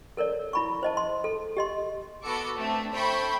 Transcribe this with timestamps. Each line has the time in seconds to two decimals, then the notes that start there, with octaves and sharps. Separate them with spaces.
0.17 A4 A#4 C#5 D5
0.53 E4 B5 C#6
0.83 C5 D#5 A5
0.97 C6
1.24 A4
1.57 G4 D#5 C6
2.22 B3 F#4 A4 D6 C#7
2.56 A3 C4 D4
2.92 A3 C5 G5 B5 C#6